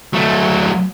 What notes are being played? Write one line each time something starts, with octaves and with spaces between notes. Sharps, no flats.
F#3 A3